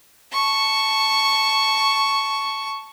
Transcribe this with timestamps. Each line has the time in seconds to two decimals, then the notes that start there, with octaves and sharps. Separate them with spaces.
0.32 A5 C#6